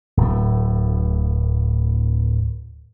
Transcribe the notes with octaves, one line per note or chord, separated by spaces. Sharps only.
D1 A2